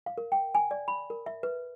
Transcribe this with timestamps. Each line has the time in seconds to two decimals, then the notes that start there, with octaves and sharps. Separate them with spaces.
0.06 F5
0.18 A#4
0.32 G5
0.55 G#5
0.71 D5
0.88 B5
1.10 A#4
1.26 E5
1.43 B4